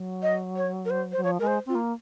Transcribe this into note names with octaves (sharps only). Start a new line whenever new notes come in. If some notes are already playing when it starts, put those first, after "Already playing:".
Already playing: F#3
D#5
C#5
A#4
C5
F#3 C5
F3 C#5
G#3 A#4
C5
C4 F4
A#3